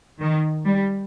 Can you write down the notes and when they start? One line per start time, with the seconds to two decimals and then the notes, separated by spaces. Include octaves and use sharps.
0.20 D#3
0.64 G3